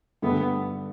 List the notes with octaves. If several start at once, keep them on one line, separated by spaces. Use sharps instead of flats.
G2 D3 A3 B3